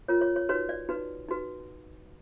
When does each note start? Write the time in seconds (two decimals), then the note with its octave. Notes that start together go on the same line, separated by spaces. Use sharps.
0.08 F4 A#4 C#5
0.21 C#5
0.36 C#5
0.49 D#4 F#4 B4 C#5
0.69 D5
0.89 D#4 F#4 B4
1.29 D#4 F#4 B4